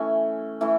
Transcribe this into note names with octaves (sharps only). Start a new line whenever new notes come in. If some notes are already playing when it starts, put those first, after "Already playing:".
Already playing: E3 A3 C#4 G#5
E3 A3 C#4